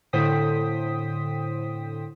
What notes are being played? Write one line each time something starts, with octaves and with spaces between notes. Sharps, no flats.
A2 D3 C5 G5 D#6 B6